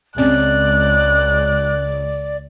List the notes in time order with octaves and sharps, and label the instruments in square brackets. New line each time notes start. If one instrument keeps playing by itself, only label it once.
[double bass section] C#2 [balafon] C4 C#4 [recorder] D5 [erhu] F#6